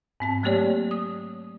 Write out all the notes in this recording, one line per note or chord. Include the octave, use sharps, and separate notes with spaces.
G#2 C4 A5
F#3 A3 A#3 G4 C#5 D5
D#6